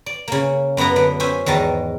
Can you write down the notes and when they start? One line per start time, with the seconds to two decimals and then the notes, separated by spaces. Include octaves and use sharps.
0.06 D5
0.28 C#3 A#3
0.77 F#2 B3 E4 F#5 A#5
0.96 D3 B3
1.20 C#4 C5 E5 G#5
1.46 E2 G#2 D#3 A5 A#5